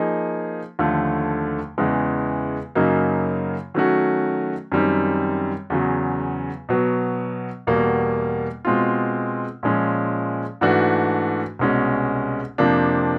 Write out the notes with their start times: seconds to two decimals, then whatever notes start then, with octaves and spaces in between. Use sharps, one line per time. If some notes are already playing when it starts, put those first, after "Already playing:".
Already playing: F3 A#3 D#4 G#4
0.79 D#2 D3 F3 A3
1.78 E2 C#3 E3 G#3
2.75 F#2 C#3 F#3 A#3 D#4
3.74 D#3 F#3 A3 C#4 F#4
4.72 F#2 D#3 G3 C4
5.70 E2 C#3 F#3
6.69 B2 F#3 B3
7.67 E2 B2 G3 A#3
8.65 B2 G#3 C4 F4
9.63 A#2 F3 G#3 C#4
10.61 G#2 E3 A3 D4 F#4
11.59 C2 B2 G#3 C#4
12.58 F2 C3 F3 A#3 D4